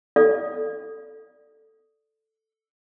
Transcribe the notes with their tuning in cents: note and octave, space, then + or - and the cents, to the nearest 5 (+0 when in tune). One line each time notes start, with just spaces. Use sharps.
A4 +0 D5 +0 F5 +0